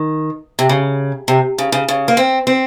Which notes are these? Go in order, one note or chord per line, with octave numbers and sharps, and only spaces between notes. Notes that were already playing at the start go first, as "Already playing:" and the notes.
Already playing: D#3
C3
C#3
C3
C#3
C#3
C#3
A#3
C4
C4